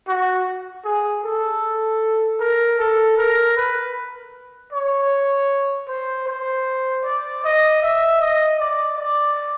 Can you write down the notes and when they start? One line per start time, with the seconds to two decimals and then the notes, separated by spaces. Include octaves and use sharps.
0.08 F#4
0.85 G#4
1.24 A4
2.40 A#4
2.79 A4
3.17 A#4
3.57 B4
4.73 C#5
5.88 C5
6.27 C5
7.05 D5
7.44 D#5
7.82 E5
8.21 D#5
8.60 D5
8.98 D5